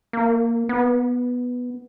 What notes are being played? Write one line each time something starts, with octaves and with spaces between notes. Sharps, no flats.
A#3
B3